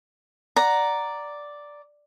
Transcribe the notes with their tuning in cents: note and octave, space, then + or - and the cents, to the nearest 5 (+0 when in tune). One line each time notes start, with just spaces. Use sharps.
D5 +0 F#5 +0 A#5 +0